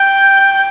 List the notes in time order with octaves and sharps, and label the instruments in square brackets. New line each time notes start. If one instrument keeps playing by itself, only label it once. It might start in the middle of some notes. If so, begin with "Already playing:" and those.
Already playing: [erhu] G5 [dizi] G6
[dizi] G6